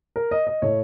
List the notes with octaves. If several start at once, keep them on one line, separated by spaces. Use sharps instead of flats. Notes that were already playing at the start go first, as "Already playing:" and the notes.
A#4
D#5
D#5
A2 A3 C#5